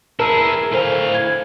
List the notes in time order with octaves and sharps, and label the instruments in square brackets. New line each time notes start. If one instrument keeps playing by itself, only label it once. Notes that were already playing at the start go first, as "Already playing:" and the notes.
[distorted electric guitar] E4 G#4 [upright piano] A#4 [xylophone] A5 E6
[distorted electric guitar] A2 F5 [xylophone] A4 C5 G#5
[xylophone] G#6